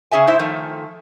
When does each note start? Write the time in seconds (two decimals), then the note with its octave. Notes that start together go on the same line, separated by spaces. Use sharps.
0.11 C#3 C#4 G#4 E5 G#5
0.27 G#2 E4 C5 E5
0.39 D#3 F3 A3